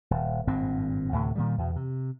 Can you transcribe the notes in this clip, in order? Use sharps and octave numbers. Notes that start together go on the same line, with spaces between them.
D#1
G#1 G2 A#2 C4
D2 A2 C3
A#2 D#3 G3
E2 B2
C3